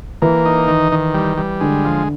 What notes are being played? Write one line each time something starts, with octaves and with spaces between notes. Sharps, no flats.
E3 A#3
D#4
D#3
D#3
G3
G3
D3 G#3
F3